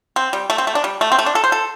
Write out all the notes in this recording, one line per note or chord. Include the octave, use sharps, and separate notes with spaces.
C4
G3
A3
C4
A3
D4
G3
A3
C4
A3
D4
A4
C5
A4